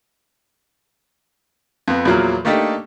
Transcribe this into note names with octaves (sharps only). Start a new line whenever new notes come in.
F2 B3
E2 A#2 F3 F#3 A#3
A3 A#3 D4 D#4 G4 A4